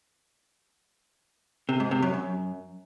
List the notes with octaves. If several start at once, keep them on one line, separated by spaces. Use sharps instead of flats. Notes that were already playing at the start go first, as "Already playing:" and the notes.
C3
G#2
C3
F#2
F#2